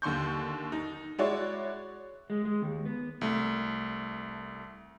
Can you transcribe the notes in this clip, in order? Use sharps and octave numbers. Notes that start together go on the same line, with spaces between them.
D#2 D3 C6 C#6 G6
D#4
G#3 E4 F#4 C#5 D5
G#3
G#3
D#2
B3
C2 A3